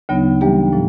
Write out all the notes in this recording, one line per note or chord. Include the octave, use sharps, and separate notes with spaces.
D2 C#3 F#3 B3 D#4
E3 G3 A#3 D4 G4
A2 F3